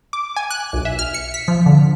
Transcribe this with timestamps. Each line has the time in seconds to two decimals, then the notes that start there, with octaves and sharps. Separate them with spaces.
0.13 D6
0.36 G#5
0.51 F#6
0.73 B1
0.85 E5
0.99 F6
1.14 C#7
1.34 B6
1.48 F3
1.66 D3